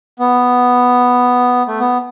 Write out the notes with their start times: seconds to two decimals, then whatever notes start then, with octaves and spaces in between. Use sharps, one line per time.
0.19 B3
1.67 A3
1.79 B3